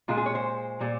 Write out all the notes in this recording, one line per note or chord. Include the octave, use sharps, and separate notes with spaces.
A#2 G#3 F4
G#4
C#5
C5
A#2 G3